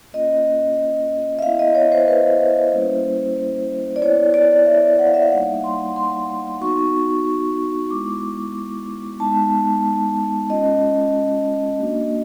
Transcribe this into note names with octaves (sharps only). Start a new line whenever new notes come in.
A#3 C#4 F4 D#5
E5
B3 E4 F5
D#5
C#5
C5
B4
C5
G3 A#3 C#4 E4
D5
B3 E4 C#5
D5
E5
F#5
F5
E5
F5
G3 A#3 D#4 F#5
C6
C6
B3 D#4 F#4 C#6
G#3 B3 E4 D6
G#3 B3 D#4 A5
G#3 C#4 F4 D#5
A#3 D4 F#4